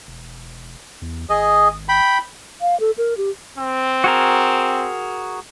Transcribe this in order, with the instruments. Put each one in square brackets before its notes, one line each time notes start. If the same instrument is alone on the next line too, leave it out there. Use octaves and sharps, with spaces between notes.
[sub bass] E1
E2
[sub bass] G#1 [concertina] G#4 D#5
[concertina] G5 B5
[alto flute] F5
A4
A#4
G4
[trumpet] C4
[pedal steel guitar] F#4 G#4 A#4